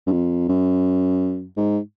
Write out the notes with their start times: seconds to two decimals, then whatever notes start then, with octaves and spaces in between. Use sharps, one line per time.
0.07 F#2
0.12 F2
0.49 F#2
1.57 G#2